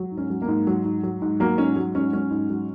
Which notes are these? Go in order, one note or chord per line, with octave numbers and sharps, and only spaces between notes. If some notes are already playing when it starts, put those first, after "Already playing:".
Already playing: F#3
G#2
C#4
F#3
A#3
G#2
F#3
G#2
F#3
G#2
F#3 A#3
G#2 C#4
F#3
G#2 C#4
F#3 C#4
G#2
F#3